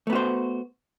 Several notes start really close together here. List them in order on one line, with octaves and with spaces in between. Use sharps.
A3 B3 F#4 C5